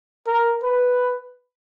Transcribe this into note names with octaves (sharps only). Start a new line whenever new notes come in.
A#4
B4